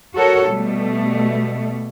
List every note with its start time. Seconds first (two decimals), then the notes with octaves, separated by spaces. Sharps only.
0.16 F#4 A4 A#4 C#5
0.49 B2 G3 A3